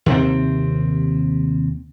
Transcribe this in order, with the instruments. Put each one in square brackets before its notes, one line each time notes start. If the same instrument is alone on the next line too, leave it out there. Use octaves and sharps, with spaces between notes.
[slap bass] D#2 C3 C4